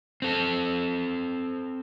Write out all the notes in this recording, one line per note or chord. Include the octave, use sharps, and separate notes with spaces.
C4 A4